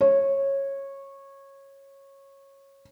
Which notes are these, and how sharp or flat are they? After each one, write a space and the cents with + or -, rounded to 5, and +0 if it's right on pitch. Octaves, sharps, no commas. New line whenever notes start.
C#5 -15